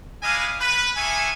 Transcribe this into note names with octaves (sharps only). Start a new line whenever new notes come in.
D4 E4 D#5 F5 G#5
B4
A#3 G#4 A4 C#5 E5 G#5